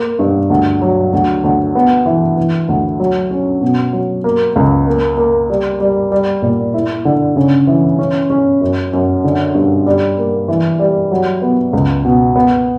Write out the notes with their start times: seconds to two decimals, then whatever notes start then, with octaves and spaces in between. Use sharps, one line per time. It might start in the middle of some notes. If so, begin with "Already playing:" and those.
Already playing: A#3
0.19 G2
0.50 D2
0.82 F#3
1.13 D2
1.44 D2
1.75 B3
2.06 E3
2.37 E3
2.69 D2
3.00 F#3
3.31 C#4
3.62 B2
3.93 F#3
4.24 A#3
4.56 C#2
4.87 A#3
5.17 A#3
5.50 G3
5.80 G3
6.12 G3
6.42 A#2
6.74 E4
7.05 D3
7.36 C#3
7.67 E3
7.99 C#4
8.30 C#4
8.61 F#2
8.93 F#2
9.24 D3
9.54 G2
9.86 G3
10.18 A#3
10.48 E3
10.79 G3
11.11 F#3
11.42 B3
11.73 C#2
12.05 B2
12.36 B3